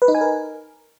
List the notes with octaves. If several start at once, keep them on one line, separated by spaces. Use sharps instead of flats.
B4
D#4
G#5
A#4